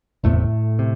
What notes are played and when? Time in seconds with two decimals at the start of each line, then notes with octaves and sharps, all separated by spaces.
0.24 F#1 E2 A2 C3 A3
0.79 C3